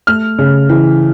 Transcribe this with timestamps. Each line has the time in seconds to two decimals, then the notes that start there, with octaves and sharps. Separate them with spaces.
0.07 A3 F6
0.39 C#3
0.69 E3